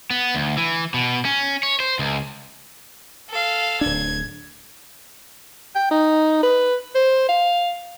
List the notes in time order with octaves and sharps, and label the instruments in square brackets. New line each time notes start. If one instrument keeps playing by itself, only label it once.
[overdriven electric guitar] B3
D2
E3
B2
C#4
C#5
C5
C#2
[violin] A4 F5
[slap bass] D1 D4 [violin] G#6
[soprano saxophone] G5
D#4
B4
C5
F5